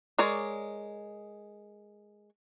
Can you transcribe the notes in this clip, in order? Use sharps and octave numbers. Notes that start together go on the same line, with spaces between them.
G#3 A#4 C#5 D5